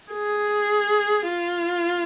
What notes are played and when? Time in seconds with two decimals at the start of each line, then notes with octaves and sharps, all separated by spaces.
0.12 G#4
1.28 F4